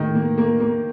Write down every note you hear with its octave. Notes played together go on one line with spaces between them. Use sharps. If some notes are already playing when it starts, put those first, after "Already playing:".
Already playing: A2 D#3 A#3
A#3
A#3
A#3